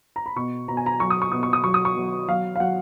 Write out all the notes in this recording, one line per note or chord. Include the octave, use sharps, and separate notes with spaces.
A#5
B5
B2 C#6
B2 A#5
G#5
A#5
F#3 C#6
D#6
C#6
B2 D#6
C#6
D#6
F#3 C#6
D#6
C#6
F#3
F#3 F5
F5
F#3 F#5